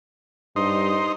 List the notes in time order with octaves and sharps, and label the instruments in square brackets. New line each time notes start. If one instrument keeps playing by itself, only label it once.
[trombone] G2 [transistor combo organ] D#4 C5